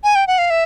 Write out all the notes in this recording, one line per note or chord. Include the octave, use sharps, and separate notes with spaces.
G#5
G5
F#5
F5
E5